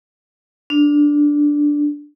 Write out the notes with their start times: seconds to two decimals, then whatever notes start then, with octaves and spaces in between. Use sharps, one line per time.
0.70 D4